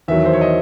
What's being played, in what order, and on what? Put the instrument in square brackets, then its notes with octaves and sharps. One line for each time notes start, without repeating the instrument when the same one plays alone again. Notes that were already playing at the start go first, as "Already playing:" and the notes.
[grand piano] E2 D#3 F#3 E5
C5
C#5
D#5